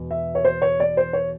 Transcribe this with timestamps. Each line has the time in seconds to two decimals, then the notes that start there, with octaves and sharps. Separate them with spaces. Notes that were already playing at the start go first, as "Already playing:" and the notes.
Already playing: E1 E2 B2
0.11 E5
0.35 C#5
0.45 C5
0.62 C#5
0.80 D5
0.97 C5
1.13 C#5